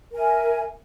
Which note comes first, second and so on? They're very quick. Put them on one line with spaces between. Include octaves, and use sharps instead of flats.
A#4 G#5 E5